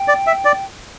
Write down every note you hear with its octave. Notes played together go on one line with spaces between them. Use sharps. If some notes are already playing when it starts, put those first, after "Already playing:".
Already playing: G5
D5
E5
D5